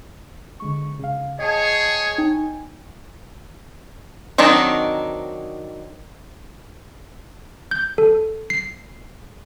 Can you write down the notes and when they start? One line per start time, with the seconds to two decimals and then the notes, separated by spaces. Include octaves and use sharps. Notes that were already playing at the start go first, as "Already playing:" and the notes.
0.60 D3 G#3 C#6
0.99 C#3 F5
1.39 G#4 C#5 D#5 G5 A5
2.18 D#4 G5 G#5
4.38 D#3 F#3 C4 D4 D#4
7.71 G6
7.98 A4
8.50 C7